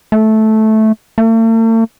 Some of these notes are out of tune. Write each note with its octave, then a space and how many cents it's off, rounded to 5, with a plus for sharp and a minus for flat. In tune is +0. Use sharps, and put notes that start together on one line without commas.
A3 -10
A3 +45